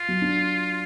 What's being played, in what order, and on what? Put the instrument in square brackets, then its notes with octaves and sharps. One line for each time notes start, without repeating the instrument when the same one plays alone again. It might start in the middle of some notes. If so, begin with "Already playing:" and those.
Already playing: [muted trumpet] F4
[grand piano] F#3
D4